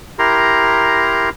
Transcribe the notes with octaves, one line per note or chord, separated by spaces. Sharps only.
E4 G4 A#4 A#5 C6